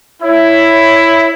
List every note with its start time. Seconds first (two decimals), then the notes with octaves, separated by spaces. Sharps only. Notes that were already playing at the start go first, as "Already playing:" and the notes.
0.22 E4 C#5